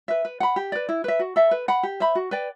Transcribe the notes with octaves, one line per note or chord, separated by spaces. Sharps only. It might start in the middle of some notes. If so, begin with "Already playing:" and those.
B4 E5
B4
F#5 B5
G4
B4 D5
E4
B4 E5
F#4
A4 E5
B4
F#5 B5
G4
C5 E5 B5
F#4
B4 D5 G5